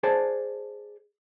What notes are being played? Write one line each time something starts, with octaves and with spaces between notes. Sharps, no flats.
G#4 C5 D5 A5